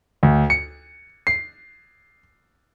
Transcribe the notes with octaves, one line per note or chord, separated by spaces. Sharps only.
D2
C#7
C7